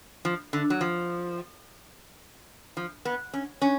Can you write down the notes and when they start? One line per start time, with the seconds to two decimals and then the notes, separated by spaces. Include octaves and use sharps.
0.25 F3
0.53 D3
0.70 F#3
0.81 F3
2.77 F3
3.05 B3
3.33 C#4
3.62 C#4